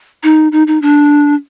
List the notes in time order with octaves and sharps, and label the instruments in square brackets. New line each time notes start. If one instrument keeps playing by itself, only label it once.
[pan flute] D#4
D#4
D#4
D4